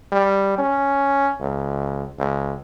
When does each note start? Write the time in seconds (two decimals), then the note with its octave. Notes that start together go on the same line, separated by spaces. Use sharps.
0.12 G3
0.58 C#4
1.40 C#2
2.19 C#2